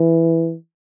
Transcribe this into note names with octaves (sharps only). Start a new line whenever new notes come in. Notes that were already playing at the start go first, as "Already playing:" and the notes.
Already playing: E3